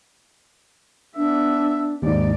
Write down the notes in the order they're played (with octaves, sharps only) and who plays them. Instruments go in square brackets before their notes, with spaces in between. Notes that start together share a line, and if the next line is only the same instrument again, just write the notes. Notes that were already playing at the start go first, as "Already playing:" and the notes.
[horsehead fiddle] B3 E5 [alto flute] D4
[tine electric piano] D#2 G#2 [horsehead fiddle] D#4 D5